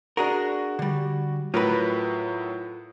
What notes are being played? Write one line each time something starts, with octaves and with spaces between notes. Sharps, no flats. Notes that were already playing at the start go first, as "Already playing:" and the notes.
D4 F#4 G#4 A#4
D3 G3
A2 F#3 F4 A#4 B4